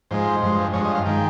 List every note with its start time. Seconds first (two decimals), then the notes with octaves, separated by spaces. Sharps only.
0.11 G#2 F3 G#3 C5
0.42 G2 F3 G#3
0.73 G2 F3 G#3 C#5
0.85 D#5
0.95 F5
1.06 D#3 G#3 G5